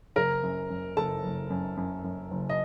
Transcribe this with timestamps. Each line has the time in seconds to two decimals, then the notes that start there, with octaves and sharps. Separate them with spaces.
0.16 F#1 A#4 A#5
0.43 F#2
0.70 F#2
0.97 F#1 A4 A5
1.24 F#1
1.50 F#2
1.77 F#2
2.04 F#2
2.31 F#1
2.49 D#5